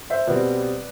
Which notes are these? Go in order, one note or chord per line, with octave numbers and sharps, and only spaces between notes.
C5 E5
B2 G3 C4 B4 D5